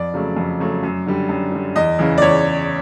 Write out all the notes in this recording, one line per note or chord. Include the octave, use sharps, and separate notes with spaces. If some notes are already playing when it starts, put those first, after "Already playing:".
Already playing: F2 D5
C#3 F#3 A3
F2
C#3 F#3 A3
F#2
D3 G3
F#2
D3 G3
E2 D#5
C#3 E3
D5
E2 C#5